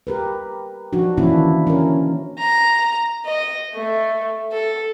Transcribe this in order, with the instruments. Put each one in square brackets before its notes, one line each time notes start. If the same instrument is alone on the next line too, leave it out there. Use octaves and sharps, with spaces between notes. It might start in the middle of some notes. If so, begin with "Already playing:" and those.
[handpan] G4 A#4 B4
F3 D4 D#4 F#4
D#3 E3 A#3 C#4 D4 E4
C#4 A#4
[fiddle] A#5
D#5
A3
A4